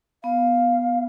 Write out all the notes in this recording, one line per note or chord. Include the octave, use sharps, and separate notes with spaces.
B3 F5